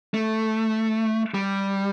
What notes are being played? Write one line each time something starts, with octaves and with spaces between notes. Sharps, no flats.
A3
G3